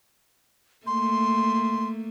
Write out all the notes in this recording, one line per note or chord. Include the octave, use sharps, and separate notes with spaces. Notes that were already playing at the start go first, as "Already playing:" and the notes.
A3 A#3 C6